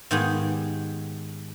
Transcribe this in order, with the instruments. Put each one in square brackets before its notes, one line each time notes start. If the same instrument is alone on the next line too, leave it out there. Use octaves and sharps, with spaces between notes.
[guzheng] G#2 D#3 G#3 B3 G4 G#4